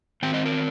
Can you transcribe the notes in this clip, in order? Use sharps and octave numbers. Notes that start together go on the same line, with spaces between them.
D#3 C4 G5
D#5
A#4